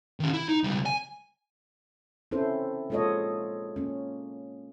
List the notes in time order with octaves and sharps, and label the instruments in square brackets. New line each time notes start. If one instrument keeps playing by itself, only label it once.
[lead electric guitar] D#3 C#4
E4
D#4
C#2 G3
G#5
[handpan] C4 C#4 E4 A4 C5
G#3 A#3 F4 A4 C#5 D#5
A#3 C#4